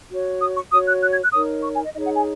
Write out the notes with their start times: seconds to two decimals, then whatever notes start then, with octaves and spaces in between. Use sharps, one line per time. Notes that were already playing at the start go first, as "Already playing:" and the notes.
0.10 F#4 C#5
0.41 D#6
0.56 C#6
0.71 F#4 C#5 D#6
0.87 F#6
1.01 F#6
1.12 G#6
1.23 F#6
1.32 D#4 A#4 C#5 D#6
1.64 C#6
1.74 G#5
1.83 D#5
1.95 D#4 G#4 C#5 D#5
2.05 F#5
2.15 G#5